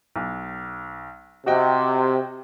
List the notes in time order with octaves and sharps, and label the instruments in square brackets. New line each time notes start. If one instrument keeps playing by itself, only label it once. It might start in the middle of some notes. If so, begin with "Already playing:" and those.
[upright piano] B1
[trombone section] C3 [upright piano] F#4 D#5 G5